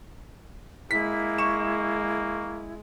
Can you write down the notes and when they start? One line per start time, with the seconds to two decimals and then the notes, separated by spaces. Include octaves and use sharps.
0.91 G#3 A#3 E4 B6
1.38 C#6 E7